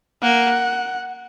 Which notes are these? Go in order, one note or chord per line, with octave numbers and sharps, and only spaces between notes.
A#3 F#5